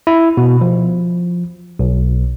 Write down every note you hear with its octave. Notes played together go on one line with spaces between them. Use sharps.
E4
B2
F3
B1